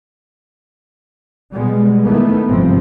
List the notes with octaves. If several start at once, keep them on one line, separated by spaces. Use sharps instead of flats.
B2 G3 G#3
D#3 E3 A3 B3
G1 G#2 C3 F3 C4